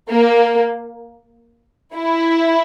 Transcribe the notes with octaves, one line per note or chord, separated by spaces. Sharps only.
A#3
E4